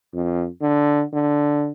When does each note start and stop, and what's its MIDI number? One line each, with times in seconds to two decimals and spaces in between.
0.14 0.47 41
0.61 1.03 50
1.13 1.72 50